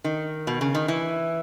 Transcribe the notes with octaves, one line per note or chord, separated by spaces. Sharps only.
D#3
B2
C#3
D#3
E3